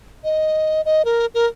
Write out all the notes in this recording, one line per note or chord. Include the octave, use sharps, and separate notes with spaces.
D#5
D#5
A#4
A#4